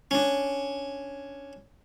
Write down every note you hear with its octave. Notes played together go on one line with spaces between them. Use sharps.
C#4 D4